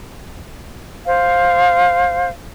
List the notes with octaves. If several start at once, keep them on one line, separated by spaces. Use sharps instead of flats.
C5 F5